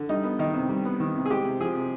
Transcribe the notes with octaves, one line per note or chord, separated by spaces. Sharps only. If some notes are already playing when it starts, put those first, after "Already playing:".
Already playing: D3
G3 D#4
B3
D#3 D#4
C3
G3
B3
D#3
C3
G#4
G#3 G4
C3
F3 G#4
C3